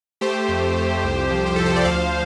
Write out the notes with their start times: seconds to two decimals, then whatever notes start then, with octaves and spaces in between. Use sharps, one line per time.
0.21 A3 G4 C5
0.49 F2
0.76 F2
1.03 C2
1.31 F3
1.46 G4
1.56 F3 A4
1.66 C5
1.76 D5
1.85 D2 C5 F5